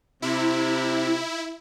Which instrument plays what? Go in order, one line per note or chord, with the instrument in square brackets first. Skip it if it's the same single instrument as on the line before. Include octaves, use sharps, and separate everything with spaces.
[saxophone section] C3 [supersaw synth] E4